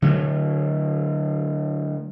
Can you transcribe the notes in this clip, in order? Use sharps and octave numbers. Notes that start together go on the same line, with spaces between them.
D3 F#3 A3